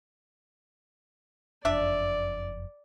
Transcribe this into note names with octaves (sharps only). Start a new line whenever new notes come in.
F#1 F2 D4 D5 E5